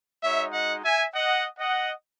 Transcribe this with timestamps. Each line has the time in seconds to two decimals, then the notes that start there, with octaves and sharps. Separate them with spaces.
0.22 G#3 D#4 F#4 C#5 E5
0.53 D#5 F#5
0.83 E5 G#5
1.14 D#5 F#5
1.60 D#5 F#5